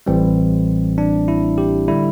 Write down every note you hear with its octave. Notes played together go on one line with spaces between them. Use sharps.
A1 A2 E3 G3 C4
D4
E4
G4
D3 G3 E4